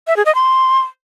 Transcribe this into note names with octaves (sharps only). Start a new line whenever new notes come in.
E5
G#4
D#5
C6